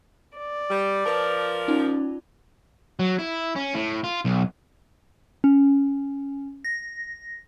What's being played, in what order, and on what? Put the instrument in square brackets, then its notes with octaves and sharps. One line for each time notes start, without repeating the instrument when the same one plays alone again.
[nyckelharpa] D5
[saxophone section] G3
[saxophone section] F3 A#4 [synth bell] B4 A5
[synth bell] C#4 D#4 F4
[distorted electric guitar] F#3
E4
C#4
A2
F4
B1
[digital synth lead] C#4
A#6